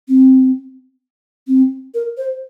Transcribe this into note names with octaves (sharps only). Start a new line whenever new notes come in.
C4
C4
A#4
C5